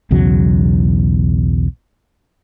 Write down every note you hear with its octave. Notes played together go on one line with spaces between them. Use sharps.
B1 E2 C#3 F#3